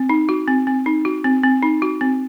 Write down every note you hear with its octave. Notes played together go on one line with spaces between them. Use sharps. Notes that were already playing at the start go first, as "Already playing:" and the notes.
Already playing: C4
D#4
F#4
C4
C4
D#4
F#4
C4
C4
D#4
F#4
C4